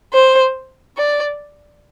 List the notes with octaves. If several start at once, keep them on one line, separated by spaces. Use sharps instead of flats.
C5
D5